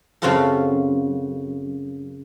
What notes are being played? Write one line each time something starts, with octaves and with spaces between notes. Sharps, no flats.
F#2 C#3 C4 F4 F#4 A4